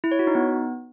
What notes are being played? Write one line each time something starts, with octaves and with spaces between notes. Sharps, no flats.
E4
C#5
F#4
D#4
B3